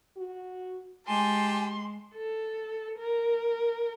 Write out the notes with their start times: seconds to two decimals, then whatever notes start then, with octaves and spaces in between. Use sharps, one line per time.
0.17 F#4
1.07 G#3 G4 G#5 A5 C6
2.15 A4
2.99 A#4